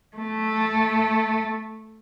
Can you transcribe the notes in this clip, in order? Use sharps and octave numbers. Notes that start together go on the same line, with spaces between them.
A3